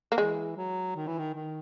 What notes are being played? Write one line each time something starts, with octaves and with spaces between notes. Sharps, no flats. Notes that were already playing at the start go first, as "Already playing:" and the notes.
A#3
E3 G#3
F#3
D#3
E3
D#3
D#3